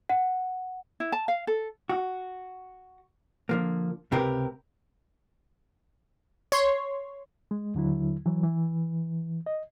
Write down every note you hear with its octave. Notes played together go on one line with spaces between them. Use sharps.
F#5
E4
A5
F5
A4
F#4
D3 F3 A#3
C#2 C3 G4 A#4 B4
C#5 C6
G#3
D#2 D3 F#3 E4
E3 F#3
E3
D#5